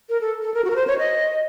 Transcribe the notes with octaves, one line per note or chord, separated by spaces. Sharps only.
A#4
A4
A4
A#4
F#4
A#4
C5
C#5
D#5